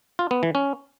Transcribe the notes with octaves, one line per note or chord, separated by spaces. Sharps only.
F4
B3
E3
C#4